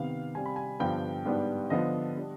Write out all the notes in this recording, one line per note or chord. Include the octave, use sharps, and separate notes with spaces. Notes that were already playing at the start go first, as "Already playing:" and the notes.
Already playing: C3 D#3 B3 F5
C3 G3 C4 G#5
B5
G#5
G2 D3 F3 B3 G5
G#2 G3 B3 D4
D3 F3 B3 D4 D#5
G3 D4